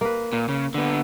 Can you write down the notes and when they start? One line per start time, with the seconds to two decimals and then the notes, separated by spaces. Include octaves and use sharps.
0.01 A#3 B4
0.33 A#2
0.49 C#3
0.74 D3 B3